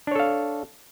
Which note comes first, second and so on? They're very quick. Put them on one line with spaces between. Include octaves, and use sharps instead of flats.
D4 C#5 A4 F5